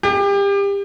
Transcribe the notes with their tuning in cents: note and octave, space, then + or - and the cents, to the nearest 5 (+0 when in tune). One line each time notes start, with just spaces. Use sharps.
G4 +30